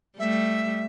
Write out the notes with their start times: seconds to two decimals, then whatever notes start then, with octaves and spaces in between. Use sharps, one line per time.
0.19 G3 A3 E5